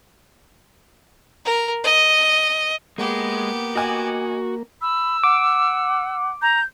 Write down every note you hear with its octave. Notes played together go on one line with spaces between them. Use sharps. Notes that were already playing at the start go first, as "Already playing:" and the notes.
A#4
D#5
G#3 A#3 B3 G4
F#4 D#5 G#5 D6
B5 E6
F#5 D6
A#5 G6